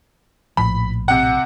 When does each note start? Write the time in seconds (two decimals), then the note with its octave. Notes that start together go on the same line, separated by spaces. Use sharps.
0.57 A#1 A2 F3 B5
1.08 C3 F#5